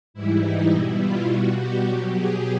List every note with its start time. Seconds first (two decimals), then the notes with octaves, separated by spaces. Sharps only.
0.14 G#2 E3 G3 E4
0.43 D#4
0.71 B2 G3 E4
1.00 F4
1.28 B2 G3 F#4
1.57 G4
1.85 B2 F#3
2.14 G#4